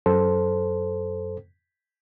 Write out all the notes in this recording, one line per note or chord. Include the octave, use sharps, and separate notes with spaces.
F#2 A4 C5